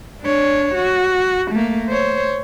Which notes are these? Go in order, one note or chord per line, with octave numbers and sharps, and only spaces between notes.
D4 C#5
F#4
A3 A#3
C5 C#5